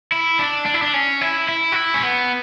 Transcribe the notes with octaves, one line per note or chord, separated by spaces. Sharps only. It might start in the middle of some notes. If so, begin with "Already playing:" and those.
E4
D4
D4
E4
D4
C#4
E4
E4
F#4
E4
C#4
B3